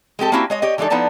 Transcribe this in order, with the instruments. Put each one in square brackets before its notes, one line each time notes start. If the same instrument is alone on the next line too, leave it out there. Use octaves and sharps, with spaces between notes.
[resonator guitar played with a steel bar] G#3 C4 G4 A4
A#3 C4 C#4 E4 F#4 G4
G#3 C#5 D#5
G4 C#5 D#5
E3 G#3 D4 D#4 A4
F3 B3 D#4 E4 D5 A5